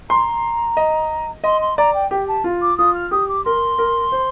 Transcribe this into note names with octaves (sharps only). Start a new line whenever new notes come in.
A#5 C6
D#5
D#5 C6
C6
D5 A#5
G5
G4 G5
A5
F4
D6
F4 D#6
F6
G4 D#6
D6
A#4 C6
A#4
C5